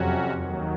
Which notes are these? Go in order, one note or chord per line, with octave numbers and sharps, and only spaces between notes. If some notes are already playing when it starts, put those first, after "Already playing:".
Already playing: F2 C3 F#3 C#4 F#4
D#2 D#3 F#3